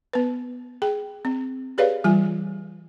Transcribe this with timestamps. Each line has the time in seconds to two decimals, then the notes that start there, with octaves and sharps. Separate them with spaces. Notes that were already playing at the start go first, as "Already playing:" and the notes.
0.13 B3 B4
0.82 G#4 G5
1.25 C4
1.78 G4 G#4 B4 C#5 D5 F5
2.04 E3 G3 F4 G#5